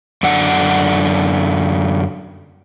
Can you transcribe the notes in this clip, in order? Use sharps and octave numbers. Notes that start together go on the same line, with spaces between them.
F#2 D3 D5 F#5